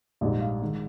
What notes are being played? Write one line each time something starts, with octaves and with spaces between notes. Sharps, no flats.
A#1 G#2 G3 D5
F5
D#3 G#3